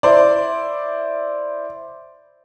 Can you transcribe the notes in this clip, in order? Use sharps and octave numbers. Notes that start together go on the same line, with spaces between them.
E4 C5 D5